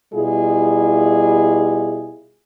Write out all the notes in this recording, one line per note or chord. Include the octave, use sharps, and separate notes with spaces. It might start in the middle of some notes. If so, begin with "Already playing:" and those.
B2 G3 E4 F4 G#4